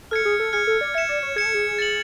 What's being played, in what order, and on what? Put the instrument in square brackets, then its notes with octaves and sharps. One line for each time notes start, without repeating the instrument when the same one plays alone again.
[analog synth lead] A4 [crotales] F6 G#6 C#7
[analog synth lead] G#4
A4
[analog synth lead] G#4 [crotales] F6 G#6 C#7
[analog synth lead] A4
D5
[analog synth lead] E5 [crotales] G#6 C#7 E7
[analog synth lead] D5
C#5
[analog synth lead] G#4 [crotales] G#6 C#7 E7
[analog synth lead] A4
G#4
[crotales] A6 C#7 F#7